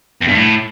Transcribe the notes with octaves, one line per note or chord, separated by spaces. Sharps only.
E2
G2
A2